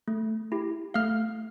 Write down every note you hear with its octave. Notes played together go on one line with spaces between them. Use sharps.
A3
E4 G4
A3 F5 F6